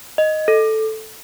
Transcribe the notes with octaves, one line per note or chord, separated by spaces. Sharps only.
D#5
A4